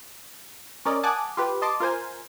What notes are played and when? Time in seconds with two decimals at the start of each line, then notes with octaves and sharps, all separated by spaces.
0.85 C#4 A#4 D5 D#5
1.03 F#5 G#5 A5 D6 D#6 F#6
1.37 F4 G4 B4
1.62 D#5 A5 C6 D6
1.80 F4 A#4 C5 G#5